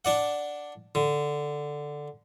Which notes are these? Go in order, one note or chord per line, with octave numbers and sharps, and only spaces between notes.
D4 D5 F#5
D3